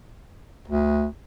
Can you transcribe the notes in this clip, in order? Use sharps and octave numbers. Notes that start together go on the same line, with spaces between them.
D2